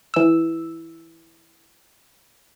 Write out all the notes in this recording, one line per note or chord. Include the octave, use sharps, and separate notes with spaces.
E3 E6